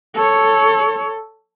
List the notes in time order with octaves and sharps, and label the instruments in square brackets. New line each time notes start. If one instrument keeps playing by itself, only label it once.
[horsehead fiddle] A4 C#5